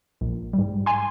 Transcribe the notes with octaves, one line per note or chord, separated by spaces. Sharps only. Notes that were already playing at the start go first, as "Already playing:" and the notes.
A#1
G#2 G3
G#5 C6